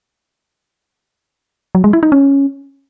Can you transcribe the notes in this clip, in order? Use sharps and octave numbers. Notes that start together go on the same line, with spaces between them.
F#3
G#3
E4
D#4
C#4